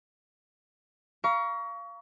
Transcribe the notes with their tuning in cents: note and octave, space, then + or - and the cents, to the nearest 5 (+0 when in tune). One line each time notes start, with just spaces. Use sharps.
F5 -15 A#5 +30 C#6 +30